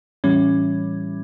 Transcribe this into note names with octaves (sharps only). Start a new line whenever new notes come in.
A2 E3 G3 C#4